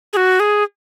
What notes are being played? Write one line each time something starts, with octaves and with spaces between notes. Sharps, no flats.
G#4
F#4
G#4